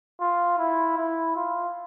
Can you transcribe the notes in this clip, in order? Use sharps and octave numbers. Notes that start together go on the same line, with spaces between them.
F4
E4
E4
F4